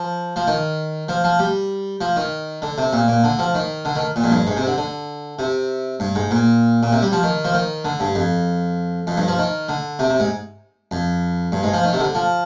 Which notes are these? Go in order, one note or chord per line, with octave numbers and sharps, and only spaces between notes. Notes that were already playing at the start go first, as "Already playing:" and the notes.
Already playing: F3
F3
D#3
F3
F3
G3
F3
D#3
D3
C3
A#2
A#2
D3
F3
D#3
D3
D#3
A#2
F2
G2
G#2
C3
D3
D3
C3
G2
G#2
A#2
A#2
C3
G3
F3
D#3
F3
D#3
D3
G2
F2
F2
G2
F3
D#3
D3
C3
C3
G#2
F2
G2
G#2
F3
D#3
C3
D3
F3